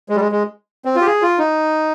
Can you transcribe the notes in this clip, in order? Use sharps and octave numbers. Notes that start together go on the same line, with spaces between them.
G#3
G3
G#3
G#3
C4
F4
G4
G#4
F4
D#4